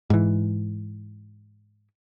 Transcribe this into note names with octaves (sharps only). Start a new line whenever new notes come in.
G#2 E3